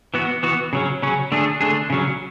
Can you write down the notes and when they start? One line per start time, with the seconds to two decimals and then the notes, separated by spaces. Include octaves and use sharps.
0.14 E3 B3 F#4
0.43 E3 B3 F#4
0.73 C#3 F#3 C#4
1.02 C#3 F#3 C#4
1.32 D3 A3 D4 G#4
1.61 D3 A3 D4 G#4
1.90 C#3 F#3 C#4